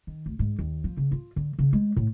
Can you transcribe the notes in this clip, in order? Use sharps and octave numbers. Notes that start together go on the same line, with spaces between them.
D#3
D2
G#2
D#2
F3
C#3
F4
D3
C#3
G#3
A2